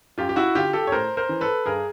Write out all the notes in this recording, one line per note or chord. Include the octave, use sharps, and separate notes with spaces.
F#2 F4 G4
G4
E4 F#4
D3 F4 G4
G4 A4
C#5
A2 A#4 C5
A#4 C5
E3
A4 B4
G2 G#4 A#4